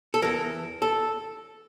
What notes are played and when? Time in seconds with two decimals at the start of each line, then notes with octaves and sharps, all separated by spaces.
0.14 A4
0.22 E2 E3 A#4
0.82 A4